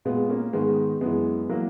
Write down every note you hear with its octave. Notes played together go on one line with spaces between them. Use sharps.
A#2 G#3 B3
A#3 C#4
G#2 D#3 G#3 B3
F#2 E3 G#3 B3
E3 F#3 A#3